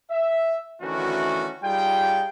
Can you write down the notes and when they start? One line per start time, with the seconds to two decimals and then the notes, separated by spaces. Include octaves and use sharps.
0.11 E5
0.82 D2 D#3 E3 A3 C#4 F#4
1.64 G3 D#4 F4 G#4 G5